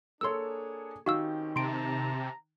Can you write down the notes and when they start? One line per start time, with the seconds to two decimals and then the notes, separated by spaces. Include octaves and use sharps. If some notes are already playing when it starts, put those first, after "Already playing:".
0.21 A#3 D4 G#4 A4 C#5 C6 E6
1.06 D#3 C4 C#4 F#4 G4 F5 E6
1.56 C3 A5 A#5 C6 D7